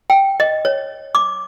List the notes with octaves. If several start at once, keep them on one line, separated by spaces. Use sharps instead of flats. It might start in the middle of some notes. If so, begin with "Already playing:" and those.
G5
D#5
C#5
D6